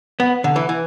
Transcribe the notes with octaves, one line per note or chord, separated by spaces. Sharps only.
B3
D3
E3
E3